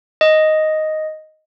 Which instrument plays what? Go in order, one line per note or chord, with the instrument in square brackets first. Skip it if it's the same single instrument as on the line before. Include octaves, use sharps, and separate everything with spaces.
[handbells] D#5